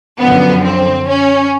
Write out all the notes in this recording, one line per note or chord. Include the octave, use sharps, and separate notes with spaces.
F#2 D3 F3 B3
C4
C#4